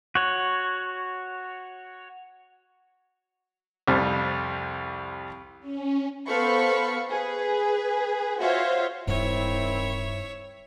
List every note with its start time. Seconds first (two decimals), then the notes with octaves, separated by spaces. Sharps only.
0.15 F#4 C#5
3.88 C2 F2 G3
5.60 C#4
6.26 B3 A4 C5 F5 B5 C#6
7.10 G#4 B4
8.39 F4 F#4 C5 C#5 E5 F5
9.07 D1 G2 D#3 G3 C4 E4 C#5 E5